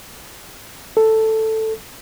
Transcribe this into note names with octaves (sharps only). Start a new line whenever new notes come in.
A4